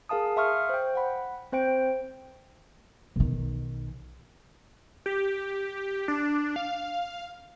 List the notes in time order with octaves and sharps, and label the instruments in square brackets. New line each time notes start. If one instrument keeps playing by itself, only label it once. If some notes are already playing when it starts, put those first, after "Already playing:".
[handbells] G#4 A#4 F5 A5 D#6
E5 F5 C6 C#6 D#6 F6
C5 G5
F#5 B5
C4 C5 G5 D7
[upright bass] B1 D#3
[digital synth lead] G4
D4
F5